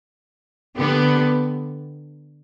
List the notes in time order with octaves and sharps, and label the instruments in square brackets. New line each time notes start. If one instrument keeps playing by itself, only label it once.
[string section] D3 B3 G4